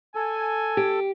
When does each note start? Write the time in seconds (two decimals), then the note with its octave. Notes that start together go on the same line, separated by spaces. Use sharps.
0.15 A4 G#5
0.77 G4